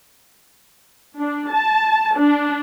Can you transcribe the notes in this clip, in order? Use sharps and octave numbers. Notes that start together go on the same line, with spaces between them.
D4
A5
D4